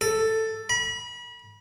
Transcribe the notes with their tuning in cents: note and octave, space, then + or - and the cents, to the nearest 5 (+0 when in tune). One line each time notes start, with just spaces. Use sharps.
A4 +10
B5 -35